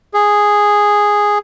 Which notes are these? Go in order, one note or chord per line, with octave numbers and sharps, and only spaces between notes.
G#4